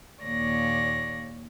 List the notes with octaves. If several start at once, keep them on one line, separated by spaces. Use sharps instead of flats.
D#2 A#2 C#5 D5 A#6